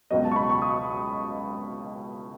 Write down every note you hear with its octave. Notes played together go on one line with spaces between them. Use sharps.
C#2 B2 F#3 D#5
A5
C#6
B5
C#6
D#6